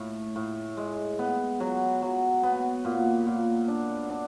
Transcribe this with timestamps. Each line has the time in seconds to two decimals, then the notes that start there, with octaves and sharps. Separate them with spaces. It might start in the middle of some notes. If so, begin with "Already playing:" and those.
Already playing: A2
0.36 A2
0.77 G#3
1.19 B3
1.60 F#3
2.02 F#3
2.43 B3
2.85 A#2
3.26 A#2
3.68 D4
4.09 D4